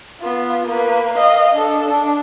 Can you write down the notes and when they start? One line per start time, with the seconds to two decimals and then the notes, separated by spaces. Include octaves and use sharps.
0.20 B3 F4
0.68 A#3 B4
1.14 D#5 F5
1.52 D4 A4
1.90 D4